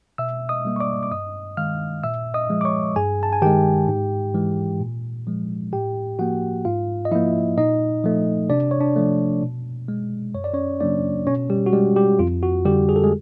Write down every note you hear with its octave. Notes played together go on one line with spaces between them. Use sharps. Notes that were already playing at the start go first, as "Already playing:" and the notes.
B2 E5 E6
D#5 D#6
G3 A#3
C#6
D5 D6
D6
G2 D#5 D#6
D#3 G#3 F5 F6
A#2 E5 E6
D#5 D#6
F3 G#3
D6
C#5 C#6
G2 G#4 G#5
A5
G#5
D#3 G#3 G4 G5
G#2
E3 G#3
A#2
F3 G#3
A2 G4 G5
F3 A#3 F#4 F#5
G#2 F4 F5
D#5
F3 A#3 E4 E5
A#2 D#4 D#5
F3 A3
C3 D4 D5
C#5
D4 D5
F3 A3
B2
G#3
F#2 C#5
D5
C#4 C#5
C#3 F#3 A#3 D4 D5
B2 C#4 C#5
G3 G4
F#4
G3 G#3 G4
G3 G4
F2 F4
F#4
D3 G3 G4
G#4
A4
G#3 G#4